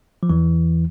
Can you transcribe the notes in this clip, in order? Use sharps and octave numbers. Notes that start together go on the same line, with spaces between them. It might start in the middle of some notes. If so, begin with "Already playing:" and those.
F3
E2 E3